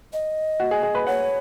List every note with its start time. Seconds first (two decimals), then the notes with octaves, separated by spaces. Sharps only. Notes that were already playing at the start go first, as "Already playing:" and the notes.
0.13 D#5
0.60 F#4
0.71 G#4
0.83 G#4
0.95 B4
1.07 C#5 F#5